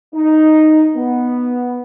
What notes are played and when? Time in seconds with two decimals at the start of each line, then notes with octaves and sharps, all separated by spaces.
0.14 D#4
0.95 B3